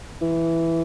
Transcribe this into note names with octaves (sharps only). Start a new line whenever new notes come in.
E3